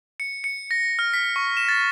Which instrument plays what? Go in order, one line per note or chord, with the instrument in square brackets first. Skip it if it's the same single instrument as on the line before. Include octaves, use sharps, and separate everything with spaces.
[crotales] C#7
C#7
A#6
F6
B6
C#6
E7
A6